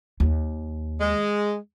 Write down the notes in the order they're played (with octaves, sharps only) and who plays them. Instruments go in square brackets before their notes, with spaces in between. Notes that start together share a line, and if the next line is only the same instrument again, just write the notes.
[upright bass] D#2
[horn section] G#3